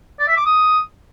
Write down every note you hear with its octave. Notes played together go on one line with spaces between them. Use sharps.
D5
E5
D6
D#6